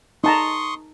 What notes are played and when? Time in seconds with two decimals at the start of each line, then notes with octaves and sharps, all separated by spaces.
0.24 D#4 A5 A#5 C6 C#6 D#6